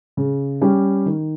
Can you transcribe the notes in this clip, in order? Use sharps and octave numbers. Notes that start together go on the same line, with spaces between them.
C#3
G3 C#4 G4
D#3